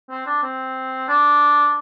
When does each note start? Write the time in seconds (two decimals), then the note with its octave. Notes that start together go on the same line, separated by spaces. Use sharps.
0.10 C4
0.27 D4
0.43 C4
1.08 D4